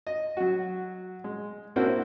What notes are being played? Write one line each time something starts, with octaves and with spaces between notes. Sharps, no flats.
D#5
F#3 F#4
G#3
A#3 C4 D4 E4 F#4 C5